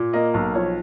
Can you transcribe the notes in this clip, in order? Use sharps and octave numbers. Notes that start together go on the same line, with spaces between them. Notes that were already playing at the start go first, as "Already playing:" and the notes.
Already playing: A#2
A#3 D#5
B1
F3 C#5